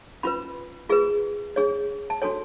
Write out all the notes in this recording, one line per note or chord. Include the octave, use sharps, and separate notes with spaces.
C#4 F4 B4 B5
F4 G#4 B4
D4 G#4 C#5
A5
D4 F#4 A4 C#5 G#5